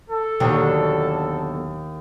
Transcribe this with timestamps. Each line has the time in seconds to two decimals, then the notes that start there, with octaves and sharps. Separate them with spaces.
0.10 A4
0.40 D#2 B2 D3 F#3